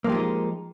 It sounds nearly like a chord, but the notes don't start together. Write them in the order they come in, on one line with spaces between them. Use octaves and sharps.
A#3 F3 G4 G#3 D#4